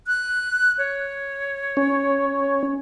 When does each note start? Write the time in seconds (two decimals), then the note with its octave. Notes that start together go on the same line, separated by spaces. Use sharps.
0.07 F#6
0.78 C#5
1.77 C#4